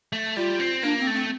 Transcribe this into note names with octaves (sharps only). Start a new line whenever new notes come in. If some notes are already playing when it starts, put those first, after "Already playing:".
A3
G3 F4
C4
A#3 D4
C4
A3
C4